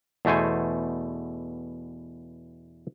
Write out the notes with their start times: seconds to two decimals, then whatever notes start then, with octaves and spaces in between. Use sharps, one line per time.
0.25 E2 B2 A3 C5 G#5